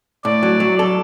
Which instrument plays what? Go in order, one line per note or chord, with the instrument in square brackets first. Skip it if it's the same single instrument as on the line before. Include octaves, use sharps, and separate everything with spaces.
[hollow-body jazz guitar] A2 [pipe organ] D5
[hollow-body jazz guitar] F#3
F#3
A4